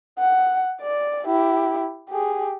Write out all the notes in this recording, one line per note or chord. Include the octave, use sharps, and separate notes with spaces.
F#5
D5
E4 G4
G4 G#4